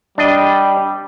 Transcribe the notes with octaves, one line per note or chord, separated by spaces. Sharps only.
G3 D4 D#5